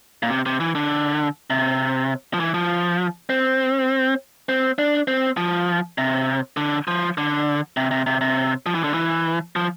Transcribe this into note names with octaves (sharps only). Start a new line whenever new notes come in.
A#2
C3
C3
E3
D3
C3
F3
E3
F3
C4
C4
D4
C4
F3
C3
D3
F3
D3
C3
C3
C3
C3
F3
E3
D3
E3
F3